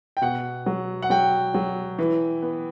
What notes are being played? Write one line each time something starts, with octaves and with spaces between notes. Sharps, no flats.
G5
B2 F#5
F#3
F#5
F#3 G5
F#3
E3
B3